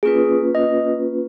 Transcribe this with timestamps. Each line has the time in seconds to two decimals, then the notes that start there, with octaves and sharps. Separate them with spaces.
0.03 A#3 C#4 F4 G#4 B4
0.55 D#5